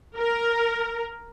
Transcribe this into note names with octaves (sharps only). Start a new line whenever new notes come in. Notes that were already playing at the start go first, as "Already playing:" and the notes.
A#4